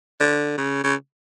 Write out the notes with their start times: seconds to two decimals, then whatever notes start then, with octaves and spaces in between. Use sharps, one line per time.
0.20 D3
0.57 C#3
0.84 C#3